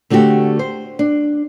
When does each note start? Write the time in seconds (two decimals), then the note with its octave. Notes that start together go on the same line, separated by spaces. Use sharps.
0.10 D3 A3 C4 F#4 G4
0.59 C5
0.99 D4